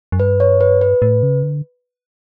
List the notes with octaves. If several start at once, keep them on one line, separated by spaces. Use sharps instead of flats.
F#2
G2 B4
C#5
B4
B4
A2
C#3
D3